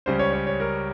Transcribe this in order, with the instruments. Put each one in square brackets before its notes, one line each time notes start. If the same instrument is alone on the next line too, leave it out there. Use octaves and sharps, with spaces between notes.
[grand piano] C#2 C#3 G3 C#4 C5
C#5
C#5
C#5
A#4